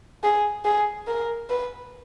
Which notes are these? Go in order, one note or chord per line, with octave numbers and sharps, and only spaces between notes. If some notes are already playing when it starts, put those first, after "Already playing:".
G#4
G#4
A#4
B4